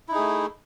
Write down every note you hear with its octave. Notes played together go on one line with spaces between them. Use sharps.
A3 D#4 E4 G#4